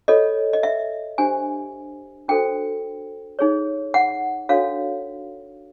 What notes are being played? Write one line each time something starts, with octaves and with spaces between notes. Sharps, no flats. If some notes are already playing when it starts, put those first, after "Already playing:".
F4 A4 C#5 D#5
D#5
E5
D4 G4 C5 G#5
D4 F#4 A4 C5 G5
D#4 G#4 C#5
F#5
D4 F#4 A4 C#5 F5